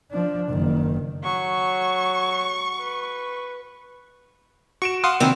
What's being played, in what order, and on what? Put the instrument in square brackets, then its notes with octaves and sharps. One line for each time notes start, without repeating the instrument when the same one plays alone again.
[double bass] F3 D4
F#1 D#3
[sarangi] F#3 [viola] C#6
[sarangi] B4
[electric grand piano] F#4 D7 E7 [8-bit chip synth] C#6
[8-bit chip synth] F5 D#6 [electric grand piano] F#5 C6 F#6
[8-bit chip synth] C3 D#3 [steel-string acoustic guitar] C4 E4 C5